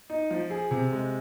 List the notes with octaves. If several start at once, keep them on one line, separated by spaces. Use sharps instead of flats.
D#4
F3
G#4
C3
G#3